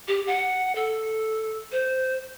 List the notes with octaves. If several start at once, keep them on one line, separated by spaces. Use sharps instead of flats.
G4
F#5
A4
C5